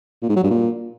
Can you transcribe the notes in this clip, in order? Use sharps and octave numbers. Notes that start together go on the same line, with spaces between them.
A#2
G#2
F#3
G2
A#2